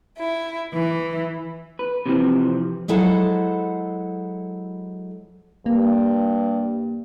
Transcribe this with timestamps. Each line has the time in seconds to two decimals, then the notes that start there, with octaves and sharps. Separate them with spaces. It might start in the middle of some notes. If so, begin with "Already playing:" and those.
0.18 E4
0.73 E3
1.79 B4
2.06 C3 E3 F3 C4
2.88 F#3 G#3 E4 A4 C5 F#5
5.66 G2 A#3